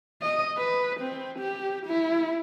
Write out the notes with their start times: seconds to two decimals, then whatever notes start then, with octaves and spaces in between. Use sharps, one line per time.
0.22 D#5
0.57 B4
1.00 C4
1.39 G4
1.86 E4